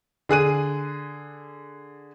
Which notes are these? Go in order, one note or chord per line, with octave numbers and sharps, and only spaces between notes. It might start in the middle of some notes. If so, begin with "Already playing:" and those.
D3 G#4 F#6 D#7